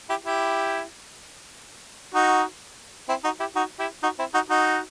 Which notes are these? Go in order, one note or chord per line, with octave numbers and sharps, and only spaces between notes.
E4 G4
E4 G4
D#4 F#4
C4 E4
D#4 F#4
E4 G4
D#4 F#4
E4 G4
D#4 F#4
C4 E4
D#4 F#4
D#4 F#4